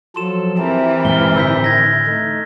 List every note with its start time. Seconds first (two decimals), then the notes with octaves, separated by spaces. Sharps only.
0.16 F3 F#3 A4 C6 E7
0.58 E3 C4 G4 A#4
1.05 G2 A#2 G#3 F6 G7
1.36 A2 D3 E6 G6 B6
1.64 G#6 A#6
2.07 A3 D#4